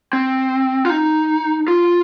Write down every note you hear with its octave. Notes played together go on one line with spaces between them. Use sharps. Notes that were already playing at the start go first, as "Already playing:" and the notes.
C4
F4
D#4
F4